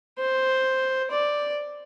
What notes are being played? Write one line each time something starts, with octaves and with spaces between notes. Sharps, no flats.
C5
D5